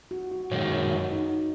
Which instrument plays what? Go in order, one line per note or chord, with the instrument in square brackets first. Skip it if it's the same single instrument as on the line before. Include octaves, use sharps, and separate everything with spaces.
[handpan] F#4
F#4
[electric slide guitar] F#2 D#3 G#3 [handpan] C#5
[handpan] F#4
D#4